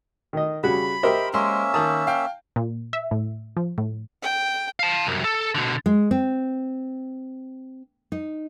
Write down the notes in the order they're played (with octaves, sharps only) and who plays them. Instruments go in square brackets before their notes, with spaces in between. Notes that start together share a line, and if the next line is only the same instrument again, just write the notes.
[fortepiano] D#3 D#5
[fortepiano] C#3 G3 F#4 [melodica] B5
[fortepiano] G4 A#4 C5 [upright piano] D#5 E5
[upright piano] G#3 C6 [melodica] A#3 C#4 E5
[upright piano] D#3 D#6 [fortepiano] A5
[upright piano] F5 G5
[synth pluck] A#2
E5
A2
F3
A2
[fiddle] G5
[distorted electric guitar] F5 A5
C2 F#2
A4
B2 D3
[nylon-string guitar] G#3
C4
D#4